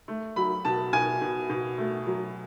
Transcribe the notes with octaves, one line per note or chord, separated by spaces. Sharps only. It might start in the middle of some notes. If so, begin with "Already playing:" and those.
A3
F#3 B5
B2 A5
B2 G#5
B2
B2
A3
F#3